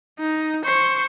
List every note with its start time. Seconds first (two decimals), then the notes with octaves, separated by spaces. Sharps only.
0.19 D#4
0.65 C5 C#6